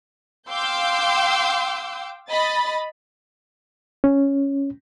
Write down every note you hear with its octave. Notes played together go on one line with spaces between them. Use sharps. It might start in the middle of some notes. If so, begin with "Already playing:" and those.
F5 G5 C6 D6 E6 G6
D#5 B5 A6
C#4